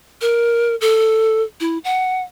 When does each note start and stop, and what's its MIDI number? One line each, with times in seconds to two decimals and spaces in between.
0.21 0.75 70
0.81 1.42 69
1.60 1.78 64
1.84 2.22 78